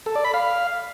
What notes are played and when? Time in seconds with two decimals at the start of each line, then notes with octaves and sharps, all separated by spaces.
0.06 A4
0.15 D5
0.25 B5
0.34 F5